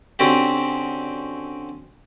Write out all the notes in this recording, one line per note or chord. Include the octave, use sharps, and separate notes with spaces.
D3 C4 C#4 F#4 G4